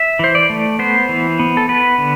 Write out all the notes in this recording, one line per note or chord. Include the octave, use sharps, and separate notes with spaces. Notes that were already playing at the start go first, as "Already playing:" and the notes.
Already playing: E5
E3 C5
D5
A3
B3 C5
E3
B3
A4
B3 B4
D3